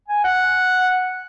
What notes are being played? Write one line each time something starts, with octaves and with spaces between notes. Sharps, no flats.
G#5
F#5